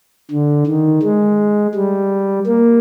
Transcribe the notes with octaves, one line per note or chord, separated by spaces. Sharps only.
D3
D#3
G#3
G3
A#3